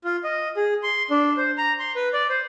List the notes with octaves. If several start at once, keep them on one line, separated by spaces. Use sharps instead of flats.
F4
D#5
G#4
C6
D4
C5
A#5
C6
B4
D5
C5